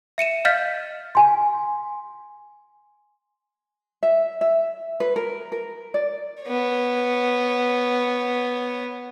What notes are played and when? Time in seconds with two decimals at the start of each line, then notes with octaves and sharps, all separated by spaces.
0.18 E5 C#7 D#7 E7
0.45 D#5 F5 F6 G6 A6 B6
1.15 G#5 C6
4.03 E5
4.41 E5
5.00 B4
5.16 A#4
5.52 A#4
5.94 D5
6.43 B3 C#5